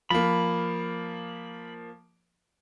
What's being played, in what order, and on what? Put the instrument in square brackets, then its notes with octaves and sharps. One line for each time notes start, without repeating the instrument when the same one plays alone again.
[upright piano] F3 A#3 [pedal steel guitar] B5